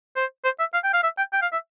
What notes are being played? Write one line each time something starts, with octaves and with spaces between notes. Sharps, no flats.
C5
C5
E5
F5
G5
F5
E5
G5
G5
F5
E5